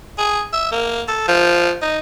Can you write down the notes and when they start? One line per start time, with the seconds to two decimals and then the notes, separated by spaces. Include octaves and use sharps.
0.18 G#4
0.53 E5
0.72 A#3
1.08 A4
1.28 F3
1.82 D#4